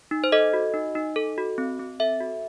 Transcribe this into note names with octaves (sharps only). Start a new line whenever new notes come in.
D#4
C5
A4 D#5
F#4
D#4
D#4
A4
F#4
C4
C4
A4 E5
F#4